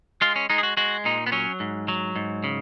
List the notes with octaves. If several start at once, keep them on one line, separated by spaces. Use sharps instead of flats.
G#3 F4
C#4
G#3 D#4
G#4
F#4
G#3 F#4
A#2 D#4
B3
F#3 C#4
G#2
F#3
G#2
C#3